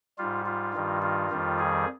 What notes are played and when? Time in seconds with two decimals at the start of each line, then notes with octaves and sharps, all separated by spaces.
0.18 G#2 G3 F4
0.46 F4
0.74 G2 D#3 G3
1.02 F4
1.30 F2 D#3 G3
1.59 G#4